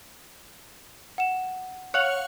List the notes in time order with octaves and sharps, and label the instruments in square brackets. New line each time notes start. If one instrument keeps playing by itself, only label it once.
[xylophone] F#5 E7
[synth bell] C#5 F5 F#5 [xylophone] F#6